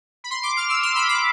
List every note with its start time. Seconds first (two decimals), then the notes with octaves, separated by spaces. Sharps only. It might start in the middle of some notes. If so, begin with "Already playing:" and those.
0.24 B5
0.31 C6
0.43 D6
0.57 F6
0.69 E6
0.83 C6
0.95 B5
1.09 D6